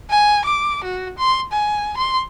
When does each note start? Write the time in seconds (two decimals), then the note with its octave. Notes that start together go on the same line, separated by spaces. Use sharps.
0.10 G#5
0.45 D6
0.84 F#4
1.18 C6
1.52 G#5
1.97 C6